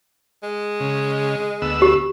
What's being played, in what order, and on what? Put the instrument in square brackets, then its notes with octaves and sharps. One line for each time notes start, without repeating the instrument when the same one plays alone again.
[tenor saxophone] G#3
[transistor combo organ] C#3
D2 B3 E6
[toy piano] G4